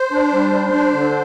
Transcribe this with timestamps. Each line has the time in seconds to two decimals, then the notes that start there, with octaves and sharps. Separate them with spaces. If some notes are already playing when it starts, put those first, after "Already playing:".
Already playing: C5
0.12 D4
0.32 G3
0.53 D4
0.73 D4
0.93 D3